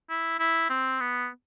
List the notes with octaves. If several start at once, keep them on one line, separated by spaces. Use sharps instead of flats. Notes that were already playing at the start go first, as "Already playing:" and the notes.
E4
E4
C4
B3